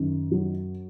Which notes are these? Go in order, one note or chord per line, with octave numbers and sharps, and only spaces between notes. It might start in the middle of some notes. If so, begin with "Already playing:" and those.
Already playing: F#2 D#3
F#3